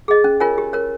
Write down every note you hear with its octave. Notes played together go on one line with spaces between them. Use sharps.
G#4 D#5
C#4
F4 A#4 C#5 G#5
G4
A#4 C#5